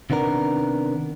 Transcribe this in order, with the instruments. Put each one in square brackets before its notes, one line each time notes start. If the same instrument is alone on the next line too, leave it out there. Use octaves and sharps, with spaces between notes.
[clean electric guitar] C3 D#3 B3 D4 A#4